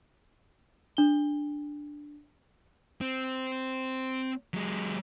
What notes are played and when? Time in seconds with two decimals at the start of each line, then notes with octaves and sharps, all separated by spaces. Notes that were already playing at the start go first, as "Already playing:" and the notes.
0.97 D4 G7
3.01 C4
4.54 F#3 G#3